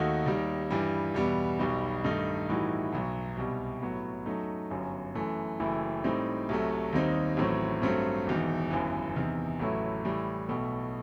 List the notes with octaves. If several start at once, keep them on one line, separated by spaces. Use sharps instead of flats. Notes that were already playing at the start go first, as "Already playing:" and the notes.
Already playing: D#2 D#3 A3 D#4 F#4
D#2 D#3 G3
G2 E3 G3
E2 B2 G3 B3
B1 B2 G3 D#4
G2 D#3 A3 D#4
A2 E3 G3 D#4 F#4
B1 B2 F#3
C2 B2 G3
A2 F#3 B3
F#2 F#3 A3 D#4
G1 F#2 F#3
F#2 E3 A3
F#1 F#2 E3 A3 E4
A2 G3 C4 D#4
C2 C3 F#3 A3
D#2 D#3 G3 C4 D#4
A1 A2 F#3 C4
G2 F#3 A3 C4
E1 E2 D#3
G1 F#2 E3
E2 C3 D#3
A1 A2 F#3 A3 E4
A2 E3 G3
B1 B2 A3